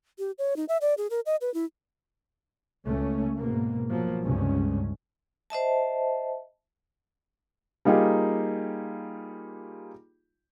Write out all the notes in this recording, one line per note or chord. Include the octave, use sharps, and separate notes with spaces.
G4
C#5
D#4
E5
D5
G#4
A#4
D#5
B4
E4
C#2 A3 C#4
G#2 B2 A#3
B2 F3 F#3 A#3
C#2 G2 C3 C#4
C5 D#5 E5 A5
G3 A#3 D#4 F4 G4 G#4